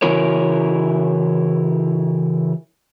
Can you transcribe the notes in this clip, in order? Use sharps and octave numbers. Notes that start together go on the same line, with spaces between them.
C#3 E3 F#3 E4 A#4 C#5